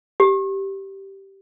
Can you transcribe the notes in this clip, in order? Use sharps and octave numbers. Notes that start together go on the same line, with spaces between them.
G4